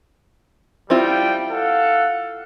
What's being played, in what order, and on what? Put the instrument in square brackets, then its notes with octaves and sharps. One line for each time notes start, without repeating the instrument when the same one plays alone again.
[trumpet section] G3 G5 [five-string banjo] C4 E4 F4
[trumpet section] A4 F5 F#5